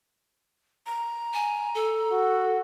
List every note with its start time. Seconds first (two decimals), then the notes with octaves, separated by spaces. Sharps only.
0.86 A#5
1.34 G#5
1.75 A4
2.12 F#4